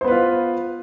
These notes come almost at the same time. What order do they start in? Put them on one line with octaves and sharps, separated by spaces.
C5 B3 B4 F4